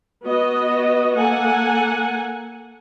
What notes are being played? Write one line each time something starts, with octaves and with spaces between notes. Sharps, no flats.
B3 F#4 D#5
A#3 A4 F#5 G#5